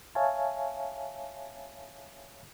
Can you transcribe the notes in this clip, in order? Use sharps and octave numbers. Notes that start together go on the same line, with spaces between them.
C#5 E5 F5 G#5 A5